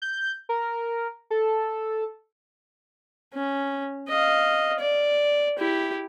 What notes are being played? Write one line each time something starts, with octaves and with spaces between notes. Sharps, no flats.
G6
A#4
A4
C#4
D#5 F5
D5
E4 G4